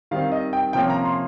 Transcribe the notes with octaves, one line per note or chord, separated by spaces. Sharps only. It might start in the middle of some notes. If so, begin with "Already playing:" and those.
D#3 G3 C4 F5
D#5
G5
C3 F3 A#3 C#4 G5
A#5
C6